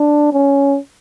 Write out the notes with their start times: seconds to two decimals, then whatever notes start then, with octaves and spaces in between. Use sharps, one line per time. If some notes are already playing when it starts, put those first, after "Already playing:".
Already playing: D4
0.33 C#4